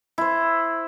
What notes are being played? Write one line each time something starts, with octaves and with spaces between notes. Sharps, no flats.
E4 C5